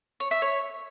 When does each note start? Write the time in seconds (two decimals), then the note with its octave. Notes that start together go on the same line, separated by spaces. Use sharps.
0.20 C#5
0.31 E5
0.42 C#5